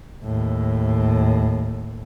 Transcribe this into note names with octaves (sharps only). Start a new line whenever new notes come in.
D#2 A2